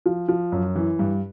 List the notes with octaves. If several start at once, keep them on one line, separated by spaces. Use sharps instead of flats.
F3
F3
F#2
E3
G2